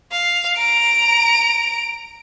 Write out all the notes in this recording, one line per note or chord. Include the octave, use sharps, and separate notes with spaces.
F5
A#5 D7